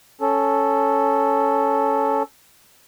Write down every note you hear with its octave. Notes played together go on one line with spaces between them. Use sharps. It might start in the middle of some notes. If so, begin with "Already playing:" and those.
C#4 A4